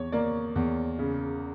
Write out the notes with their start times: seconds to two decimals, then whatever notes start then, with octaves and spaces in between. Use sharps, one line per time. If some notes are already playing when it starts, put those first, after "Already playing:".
Already playing: E2 C#5
0.12 A#3 D5
0.56 E2
0.99 C#3